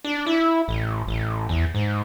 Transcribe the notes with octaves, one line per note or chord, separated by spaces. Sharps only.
D4
E4
A1
A1
E2
G#2